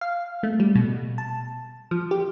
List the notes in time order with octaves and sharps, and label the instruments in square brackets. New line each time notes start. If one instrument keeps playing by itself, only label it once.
[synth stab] F5
A3
G3
B2
A5
F3
G4